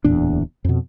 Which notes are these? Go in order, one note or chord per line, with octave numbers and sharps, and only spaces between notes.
D1 E2 A#2 D4
F2 B2